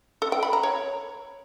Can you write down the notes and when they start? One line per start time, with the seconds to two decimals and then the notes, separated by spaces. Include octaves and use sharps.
0.22 A4
0.32 G5
0.43 B5
0.53 A#5
0.63 C#5